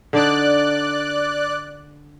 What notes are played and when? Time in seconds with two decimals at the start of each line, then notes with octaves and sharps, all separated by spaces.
0.13 D3 D4 D#4 D5 F#6